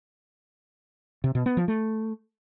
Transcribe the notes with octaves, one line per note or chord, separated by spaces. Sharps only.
C3
B2
B3
F3
A3